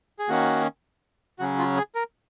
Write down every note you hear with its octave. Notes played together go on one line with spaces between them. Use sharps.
G#4
D#3 A#3 C#4 F#4
C#3 F#3 C#4 F#4
F4
G#4
A#4